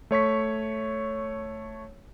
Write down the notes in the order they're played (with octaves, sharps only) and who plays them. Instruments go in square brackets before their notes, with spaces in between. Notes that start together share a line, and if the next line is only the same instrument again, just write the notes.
[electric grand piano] A3 C#5 C#6 B6